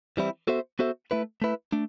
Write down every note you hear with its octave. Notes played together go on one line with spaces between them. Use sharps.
E3 G3 C4 E4
B3 F#4 A4 C5 E5
B3 F#4 A4 C5 E5
A3 E4 B4
A3 E4 B4
A3 D4